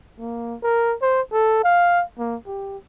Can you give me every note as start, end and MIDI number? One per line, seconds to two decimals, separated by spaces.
0.19 0.56 58
0.63 0.95 70
1.02 1.21 72
1.32 1.63 69
1.64 2.03 77
2.19 2.36 58
2.47 2.77 67